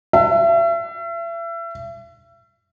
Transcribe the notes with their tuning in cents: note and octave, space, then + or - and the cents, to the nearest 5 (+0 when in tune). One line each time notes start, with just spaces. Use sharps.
E5 +35